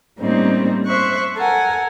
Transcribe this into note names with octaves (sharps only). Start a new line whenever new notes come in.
A2 G3 A#3 C4 C#4 D#4
C5 E5 C#6 F#6
A4 A#4 F#5 G#5